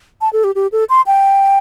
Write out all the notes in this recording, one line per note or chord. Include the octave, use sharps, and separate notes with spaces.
A5
A4
G4
G4
A4
C6
G5